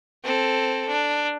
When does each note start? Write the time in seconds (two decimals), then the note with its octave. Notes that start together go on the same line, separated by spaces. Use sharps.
0.24 C4 A4
0.88 D4